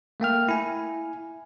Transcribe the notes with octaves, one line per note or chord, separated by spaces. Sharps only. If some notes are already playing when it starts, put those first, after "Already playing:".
A3 A#3 G5 F6
E4 G#5